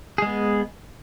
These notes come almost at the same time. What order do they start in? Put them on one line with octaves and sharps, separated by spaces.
G#4 G#3 B3